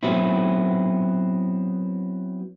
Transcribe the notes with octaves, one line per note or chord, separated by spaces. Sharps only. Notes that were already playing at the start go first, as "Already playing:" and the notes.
F#3 B3 C4 E4